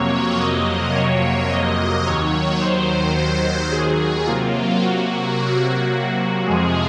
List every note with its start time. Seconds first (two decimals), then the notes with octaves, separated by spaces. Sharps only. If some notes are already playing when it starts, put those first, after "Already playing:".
Already playing: F2 C3 F#3 A#3 C#5
0.40 D#5
0.96 C#5
1.51 D#5
2.06 D#2 D#3 F#3 C#5
2.61 C5
3.16 C5
3.71 G#4
4.26 C3 F#3 A#3 F4
4.81 F#4
6.46 F2 C3 F3 G#3 G#4